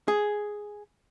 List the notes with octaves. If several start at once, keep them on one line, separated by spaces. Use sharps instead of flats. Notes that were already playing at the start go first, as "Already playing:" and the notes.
G#4